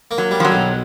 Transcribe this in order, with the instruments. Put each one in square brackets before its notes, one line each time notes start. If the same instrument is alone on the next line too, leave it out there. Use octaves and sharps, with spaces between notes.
[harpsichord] A#3
[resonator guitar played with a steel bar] F#3
[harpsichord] G3
[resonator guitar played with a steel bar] F3
F#3
[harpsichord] B1